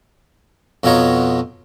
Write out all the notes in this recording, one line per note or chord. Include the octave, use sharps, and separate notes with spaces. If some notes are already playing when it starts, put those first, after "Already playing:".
F2 B2 B3 F4 C#5 A#5